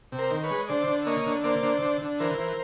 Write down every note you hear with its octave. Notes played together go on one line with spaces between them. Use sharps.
C3
A#4 C5
D#3
B4 C#5
G#3
D3 C5 D5
D3
A#3 C#5 D#5
D3
A#3 C5 D5
D3
D3
D3
E3 A#4 C5
E3